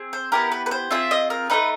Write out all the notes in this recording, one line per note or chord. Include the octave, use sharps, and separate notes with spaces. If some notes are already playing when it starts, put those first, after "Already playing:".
Already playing: C4 G#4
C5
B3 E4 G4 A#4
B4
B4
C5
C4 F4 G#4 E5
D#5
A#4
A3 C4 D#4 B4